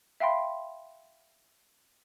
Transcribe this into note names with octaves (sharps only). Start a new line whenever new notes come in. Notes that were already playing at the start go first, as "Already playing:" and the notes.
E5 F5 G5 B5 C6